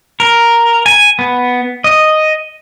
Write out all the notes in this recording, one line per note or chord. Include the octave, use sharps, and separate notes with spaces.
A#4
G#5
B3
D#5